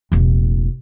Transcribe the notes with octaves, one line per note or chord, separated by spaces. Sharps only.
E1 A1